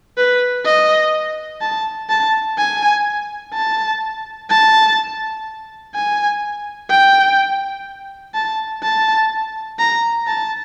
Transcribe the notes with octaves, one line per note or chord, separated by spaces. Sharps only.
B4
D#5
A5
A5
G#5
A5
A5
G#5
G5
A5
A5
A#5
A5